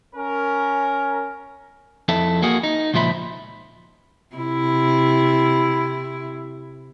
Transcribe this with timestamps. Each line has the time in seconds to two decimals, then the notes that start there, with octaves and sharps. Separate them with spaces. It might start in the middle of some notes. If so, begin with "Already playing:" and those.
0.16 C#4 A#4
2.08 F2 E4 A4
2.42 A#3 F#4 G#4
2.63 D#4
2.94 C#2 A#2 F3 C5 E5 B5
4.36 C3 E4